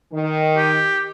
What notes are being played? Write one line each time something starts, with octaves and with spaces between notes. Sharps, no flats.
D#3
G4